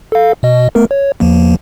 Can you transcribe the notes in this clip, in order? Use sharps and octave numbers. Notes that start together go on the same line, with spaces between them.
A4 F5
B2 D#5
A3 B3 A#4
C#5
E2 F3 A#3